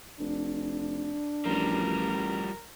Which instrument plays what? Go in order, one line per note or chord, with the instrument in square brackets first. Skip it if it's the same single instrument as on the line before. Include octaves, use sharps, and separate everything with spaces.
[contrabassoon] F1 [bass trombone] D4
[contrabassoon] A1 [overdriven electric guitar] F3 G3 [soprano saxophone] A#4